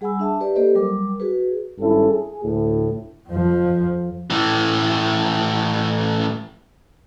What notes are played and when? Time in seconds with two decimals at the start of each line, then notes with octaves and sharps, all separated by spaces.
0.01 G3 G#4 F#5 G#5 B5 E6
0.19 D4 E5 A5
0.40 G4 B4 D5
0.56 A#3 G4 A4 C5 D#5
0.75 F#3 G3 A#4 D6
1.20 F#4 G#4 B4
1.79 G#1 G2 C#4 E4 G4 A4
2.11 G#4
2.43 D2 A2
3.30 F2 F3
4.30 A2 E3